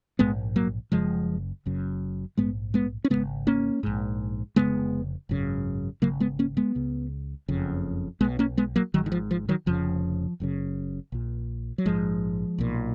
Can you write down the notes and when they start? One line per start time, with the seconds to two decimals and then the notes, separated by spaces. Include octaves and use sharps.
0.19 A#1 G#2 G#3 B3
0.56 F#3 A#3
0.92 F#1 F#2 C#3 F3 G#3
1.66 F#1 F#2 C#3
2.37 A#1 G#2 G#3 B3
2.74 G#3 B3
3.04 C#4
3.10 F#2 C#3 G#3 B3
3.16 G#1
3.47 A#3 C#4
3.83 A#1 G#2
4.56 F1 F2 C#3 G#3 B3
5.29 G#1 F#2 C#3
6.02 G#1 F#2 C#3 F#3 A#3
6.20 G#3 B3
6.39 A#3 C#4
6.57 G#3 B3
6.75 C#2 C#3
7.48 F#1 F2 C#3
8.21 B1 G#3 B3
8.24 B2
8.39 A#3 C#4
8.57 G#3 B3
8.76 F#3 A#3
8.94 G#1 D#3 F#3
8.98 G#2
9.06 D#3
9.12 F3
9.31 F3
9.49 D#3 F#3
9.66 F1 F2 C#3 F3
10.40 F#1 F#2 C#3
11.12 A#1 A#2
11.78 F#3
11.86 A#1 G#2 F3 G#3
12.58 B1 A#2